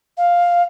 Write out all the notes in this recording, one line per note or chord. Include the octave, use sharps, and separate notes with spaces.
F5